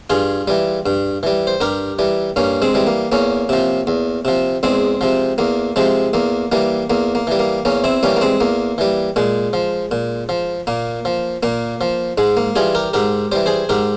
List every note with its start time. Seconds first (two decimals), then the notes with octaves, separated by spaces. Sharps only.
0.10 G2 F4 G#4
0.48 E3 G3
0.86 G2
1.23 E3 G3
1.47 C5
1.61 G2 G4 A#4
1.99 E3 G3
2.36 G2 A#3 C#4
2.62 G#3 C4
2.74 E3 G3
2.87 A#3
3.12 E2 A#3 C#4
3.49 C3 F3
3.87 E2
4.25 C3 F3
4.63 E2 G#3 C4
5.01 C3 F3
5.38 E2 A#3
5.76 C3 F3 G#3
6.13 E2 A#3
6.52 E3 G3 A#3
6.90 E2 A#3
7.15 A#3
7.27 E3 G3
7.39 A#3
7.65 E2 A#3 C#4
7.84 C4 E4
8.03 E3 G3 A#3 C#4
8.16 A#3
8.21 G#3 C4
8.40 E2 A#3
8.78 E3 G3
9.16 A#2 G#3
9.53 F3
9.91 A#2
10.29 F3
10.67 A#2 A#3
11.05 F3
11.43 A#2 A#3
11.81 F3
12.18 G#2 G#3
12.37 A#3
12.56 E3 G3 F4 G#4
12.75 G4 A#4
12.93 G#2 G4 A#4
13.32 E3 G3 C5
13.46 G#4 C5
13.69 G#2 G4 A#4